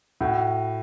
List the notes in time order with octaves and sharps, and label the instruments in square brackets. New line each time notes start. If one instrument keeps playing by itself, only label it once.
[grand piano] A2 F#4